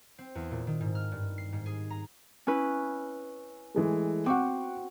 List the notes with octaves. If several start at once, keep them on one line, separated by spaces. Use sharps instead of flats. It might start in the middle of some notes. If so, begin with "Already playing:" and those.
C4
E2
A#2
D#3
G#2
F6
G2
C7
G#2
G#4
A#5
C#4 E4 B4
E3 G#3 A3
C4 F#4 F#5 C#6 D6